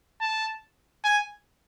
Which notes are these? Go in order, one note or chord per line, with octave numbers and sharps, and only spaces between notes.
A5
G#5